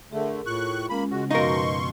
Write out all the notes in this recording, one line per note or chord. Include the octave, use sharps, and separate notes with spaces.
D3 A3 G#4 A#4
A2 F4 C#6 F#6
G#3 A#3 C#4 B5
C#3 G#3 F#4 F#5 A#6
F#2 B2 F3 D#4 A#4 F5 C6 C#6